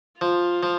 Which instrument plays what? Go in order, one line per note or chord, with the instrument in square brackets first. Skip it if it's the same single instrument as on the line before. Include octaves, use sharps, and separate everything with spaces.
[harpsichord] F3 [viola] F4
[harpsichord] F3